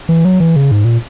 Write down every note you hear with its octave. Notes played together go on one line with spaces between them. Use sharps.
E3
F#3
E3
C#3
G#2
A#2